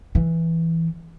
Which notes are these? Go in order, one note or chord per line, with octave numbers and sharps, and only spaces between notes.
E3